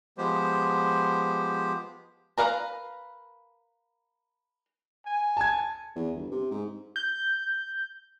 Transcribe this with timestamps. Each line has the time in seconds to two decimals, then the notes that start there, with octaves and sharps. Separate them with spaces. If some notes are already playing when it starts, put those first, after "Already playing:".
0.18 F3 G#3 B3 G4 C5
2.38 A#4 B4 F5 A#5
5.06 G#5
5.37 A5 G#6
5.95 E2
6.16 G1
6.31 C3
6.51 G#2
6.96 G6